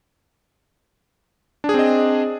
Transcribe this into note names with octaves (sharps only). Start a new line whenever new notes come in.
C4 D4 G#4 D#5